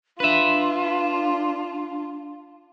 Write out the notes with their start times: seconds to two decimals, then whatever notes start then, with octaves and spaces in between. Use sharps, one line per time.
0.20 D4 F4 B4 E5